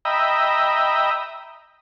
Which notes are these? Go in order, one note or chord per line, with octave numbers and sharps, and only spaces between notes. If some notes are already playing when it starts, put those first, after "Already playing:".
D#5 E5 G5 A#5 B5